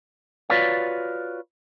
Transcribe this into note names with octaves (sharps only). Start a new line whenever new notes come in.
F4 F#4 B4 C#5 D5 F5